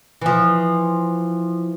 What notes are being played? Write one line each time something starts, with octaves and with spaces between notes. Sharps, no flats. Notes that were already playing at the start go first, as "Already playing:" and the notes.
E3 F3